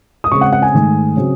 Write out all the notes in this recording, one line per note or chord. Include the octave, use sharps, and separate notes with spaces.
D#6
C#3 G#3 C4 C#6
F#5
F#5
G#5
G#2 D#3 A3
C#3 F#3 C4